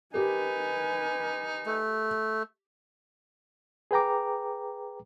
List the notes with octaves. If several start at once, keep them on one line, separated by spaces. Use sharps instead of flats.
D#4 G4 A#4 B4 G#5
A3
G#4 B4 G5 A#5 D6